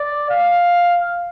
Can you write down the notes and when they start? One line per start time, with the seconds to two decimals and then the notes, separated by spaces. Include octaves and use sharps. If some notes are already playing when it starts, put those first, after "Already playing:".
Already playing: D5
0.30 F5